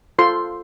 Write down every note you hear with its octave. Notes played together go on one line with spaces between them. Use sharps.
F4 A4 C5 C6